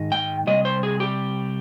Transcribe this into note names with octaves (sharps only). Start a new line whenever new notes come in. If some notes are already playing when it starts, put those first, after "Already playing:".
Already playing: G#2 D#3 D#4
G5
C3 G3 D#5
C5
G#4
G4